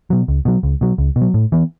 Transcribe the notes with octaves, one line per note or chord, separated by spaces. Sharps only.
B2 F#3
C#2
B2 F#3
C#2
B2 F#3
C#2
B2
F#3
A2
E3 B3